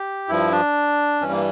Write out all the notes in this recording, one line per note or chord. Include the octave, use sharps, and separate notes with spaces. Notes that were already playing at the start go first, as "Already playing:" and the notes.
Already playing: G4
G2 F3 E4
D4
G2 E3 G3 C#4
A#3